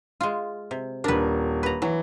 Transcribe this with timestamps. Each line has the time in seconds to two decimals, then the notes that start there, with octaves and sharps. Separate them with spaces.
0.21 G#3 F4
0.71 C3
1.04 D#1 D4 A#4 B4
1.63 B4 A#5
1.82 E3 F#3